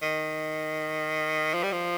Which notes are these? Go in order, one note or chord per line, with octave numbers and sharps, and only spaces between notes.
D#3
F3
G3
F3